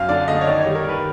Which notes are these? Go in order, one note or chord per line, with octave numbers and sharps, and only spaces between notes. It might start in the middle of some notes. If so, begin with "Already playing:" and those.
Already playing: F#2 F5
D3 D5
A3 D#5
C#5
D#3 D5
C#5
G3
A#4
D#3 B4